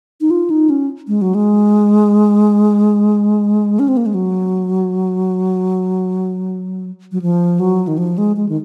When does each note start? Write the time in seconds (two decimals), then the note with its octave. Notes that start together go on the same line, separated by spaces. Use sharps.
0.21 D#4
0.30 F4
0.50 D#4
0.70 C#4
1.08 G#3
1.22 F#3
1.35 G#3
3.79 C#4
3.88 C4
3.97 A#3
4.06 G#3
4.14 F#3
7.12 F#3
7.22 F3
7.60 F#3
7.88 D#3
7.98 F3
8.18 G#3
8.36 G#3
8.49 D#3